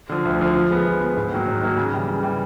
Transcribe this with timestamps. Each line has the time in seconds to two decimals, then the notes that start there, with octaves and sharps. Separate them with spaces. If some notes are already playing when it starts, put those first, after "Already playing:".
0.09 D3 F3
0.25 D2
0.39 D3 F3
0.55 F3
0.70 G#3 B3
0.86 F3
1.01 G#3 B3
1.17 G#2
1.32 D#3 F#3 A#3
1.47 G#2
1.61 D#3 F#3 A#3
1.77 C#3
1.93 E3 G3
2.08 C#3
2.23 E3 G3